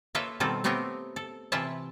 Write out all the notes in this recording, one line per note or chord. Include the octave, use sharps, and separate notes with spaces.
A#3 F4 A4 B4 C#5 E5
B2 D#3 G3 C4 F4 A4
A3 B3 C4 G4 A#4 C#5
A4
C3 E3 E4 F4 E5 A5